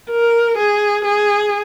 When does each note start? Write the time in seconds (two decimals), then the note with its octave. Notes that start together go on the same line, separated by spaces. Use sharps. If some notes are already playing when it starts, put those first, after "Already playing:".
0.11 A#4
0.57 G#4
1.04 G#4